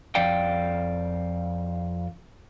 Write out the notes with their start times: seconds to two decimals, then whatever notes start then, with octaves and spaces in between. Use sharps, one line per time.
0.15 F2 D5 F5 G5